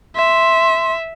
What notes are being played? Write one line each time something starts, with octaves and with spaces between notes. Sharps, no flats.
E5 C6